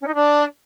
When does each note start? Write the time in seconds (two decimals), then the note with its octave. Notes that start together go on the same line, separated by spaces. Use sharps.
0.01 C#4
0.07 D#4
0.14 D4